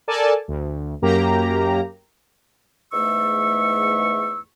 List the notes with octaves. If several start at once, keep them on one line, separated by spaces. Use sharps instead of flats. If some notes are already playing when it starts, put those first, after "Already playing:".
A4 A#4 D5 G#5 A5
D2
F#2 A#3 G4 A#5
E2 G#2 A3 C#6 E6